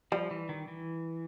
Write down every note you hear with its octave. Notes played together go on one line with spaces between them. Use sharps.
F3 G3
E3
D#3
E3